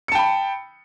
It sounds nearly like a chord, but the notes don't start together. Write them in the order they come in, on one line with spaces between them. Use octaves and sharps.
C#7 A5 G5 B5